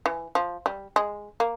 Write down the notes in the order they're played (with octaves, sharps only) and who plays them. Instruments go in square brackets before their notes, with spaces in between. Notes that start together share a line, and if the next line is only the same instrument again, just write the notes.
[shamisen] E3
F3
G3
G#3
A#3